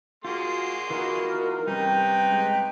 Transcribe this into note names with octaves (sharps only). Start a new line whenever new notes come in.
A#3 F4 F#4 G#4 C6
E3 B3 D#4 F4 F#4 A#4
C3 G3 C#4 D#4 B4 G5
G#3